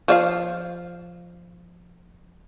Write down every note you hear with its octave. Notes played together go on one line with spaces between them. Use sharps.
F3 D5 F5